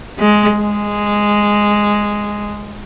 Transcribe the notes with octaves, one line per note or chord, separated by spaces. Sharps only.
G#3
G#3